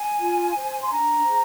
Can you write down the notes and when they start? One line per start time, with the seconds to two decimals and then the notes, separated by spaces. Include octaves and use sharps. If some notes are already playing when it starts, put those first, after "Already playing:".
Already playing: G#5
0.20 F4
0.55 C5
0.82 C6
0.89 D4 A#5
1.24 G#4 C5